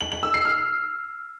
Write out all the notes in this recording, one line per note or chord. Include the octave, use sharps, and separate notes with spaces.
F#7
F#7
E6
C7
F6